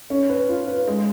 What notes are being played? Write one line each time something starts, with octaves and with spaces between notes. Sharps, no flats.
C#4
B4
F4
B4
G#3